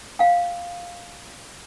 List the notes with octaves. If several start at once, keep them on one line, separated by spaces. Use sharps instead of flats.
F5 G5